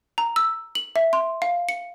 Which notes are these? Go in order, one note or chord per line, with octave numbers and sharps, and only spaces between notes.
A#5
E6
F#7
E5
C6
F5
C#7